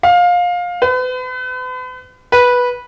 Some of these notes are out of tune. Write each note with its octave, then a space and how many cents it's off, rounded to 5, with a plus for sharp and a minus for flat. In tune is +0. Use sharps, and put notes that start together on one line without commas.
F5 +20
B4 +40
B4 -10